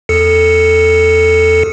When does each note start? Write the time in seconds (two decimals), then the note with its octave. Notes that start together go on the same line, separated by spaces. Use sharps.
0.09 E2 A4 C#7